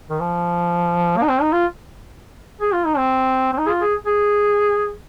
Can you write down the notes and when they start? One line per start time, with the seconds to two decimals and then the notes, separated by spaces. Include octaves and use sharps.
0.10 D#3
0.20 F3
1.17 A#3
1.23 D#4
1.29 C4
1.42 D#4
1.53 F4
2.61 G#4
2.73 F4
2.86 D#4
2.98 C4
3.53 C4
3.58 D#4
3.66 G#4
3.69 F4
3.82 G#4
4.06 G#4